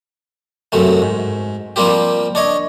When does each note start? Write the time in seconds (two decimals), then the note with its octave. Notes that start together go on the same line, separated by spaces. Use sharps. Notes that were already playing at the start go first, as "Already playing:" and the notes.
0.72 F#2 C3 F#3 A3
1.02 G#2
1.76 F3 G3 A#3 C4 G4
2.35 D4 C#5 D#5